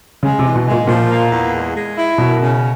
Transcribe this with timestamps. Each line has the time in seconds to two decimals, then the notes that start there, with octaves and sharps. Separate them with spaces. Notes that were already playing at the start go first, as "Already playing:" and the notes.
0.23 C#3 G#3
0.39 C3
0.45 E3
0.56 B2
0.66 G#3
0.71 A#2
0.87 A#2 F3
1.10 A#3
1.31 E2
1.53 G#3
1.75 G#3
1.97 E4
2.18 F#2 B2
2.41 C#3